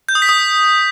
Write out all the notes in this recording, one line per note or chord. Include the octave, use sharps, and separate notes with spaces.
G6
D#6
B6
D#6